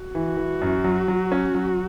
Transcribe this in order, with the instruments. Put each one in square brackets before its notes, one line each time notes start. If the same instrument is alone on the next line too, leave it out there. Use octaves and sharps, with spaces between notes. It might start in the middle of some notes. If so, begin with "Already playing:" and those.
Already playing: [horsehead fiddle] F#4
[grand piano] E3
E3
F#2
F#3
F#3
C#4
F#3